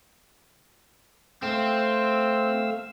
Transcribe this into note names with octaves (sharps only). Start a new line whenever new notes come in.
A3 C4 F5 E6